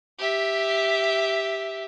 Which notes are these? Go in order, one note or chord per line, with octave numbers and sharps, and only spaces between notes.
G4 E5